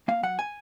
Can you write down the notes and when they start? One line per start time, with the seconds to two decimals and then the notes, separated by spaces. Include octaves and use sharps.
0.08 A#3 F5
0.23 F#3 F#5
0.39 G#5